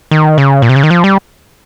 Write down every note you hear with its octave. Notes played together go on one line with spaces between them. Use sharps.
D#3
C#3
A#2
C3
C#3
D#3
F3
G3